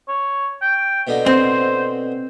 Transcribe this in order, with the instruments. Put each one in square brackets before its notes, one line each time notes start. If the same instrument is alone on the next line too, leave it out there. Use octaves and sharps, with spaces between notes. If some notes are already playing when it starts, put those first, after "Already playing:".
[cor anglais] C#5
G5
[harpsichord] B2 D3 D#4
[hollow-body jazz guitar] C4 [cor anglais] C5